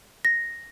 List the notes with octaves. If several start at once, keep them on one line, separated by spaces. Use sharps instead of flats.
A#6